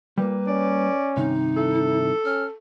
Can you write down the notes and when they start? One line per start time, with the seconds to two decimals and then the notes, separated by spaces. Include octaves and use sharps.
0.18 A#2 G3 A#3 B4
0.48 C#4 D5
1.17 G2 C3 D#3 D#4
1.57 E4 A4
2.25 C#4 F6